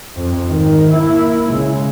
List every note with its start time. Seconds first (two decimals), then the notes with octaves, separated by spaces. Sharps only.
0.16 F2
0.48 G#2 D#3
0.90 A#3 E4
1.49 C#3 G#3